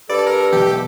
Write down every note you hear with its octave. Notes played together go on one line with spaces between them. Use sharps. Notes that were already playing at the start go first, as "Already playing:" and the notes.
G2 A4 D5
A#4
B1 E2 G4